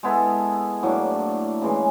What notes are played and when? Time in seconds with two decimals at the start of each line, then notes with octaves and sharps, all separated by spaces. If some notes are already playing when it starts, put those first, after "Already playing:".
0.03 G#3 B3 E4 A4
0.83 A2 F#3 A#3 D4
1.62 C#3 E3 G#3